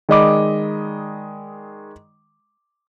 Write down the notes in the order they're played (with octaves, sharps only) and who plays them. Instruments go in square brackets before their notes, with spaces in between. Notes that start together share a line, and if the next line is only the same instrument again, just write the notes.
[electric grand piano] D#3 G#3 D5 D#5 B5 D6